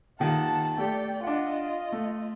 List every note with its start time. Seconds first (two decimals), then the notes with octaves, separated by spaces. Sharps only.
0.20 A#2 D#3 G3 F#5 A5
0.78 A3 G4 A4 D5 G5
1.23 D4 F4 D#5 F#5
1.92 A3